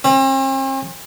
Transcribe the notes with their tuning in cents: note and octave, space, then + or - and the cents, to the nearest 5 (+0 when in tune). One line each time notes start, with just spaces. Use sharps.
C4 +45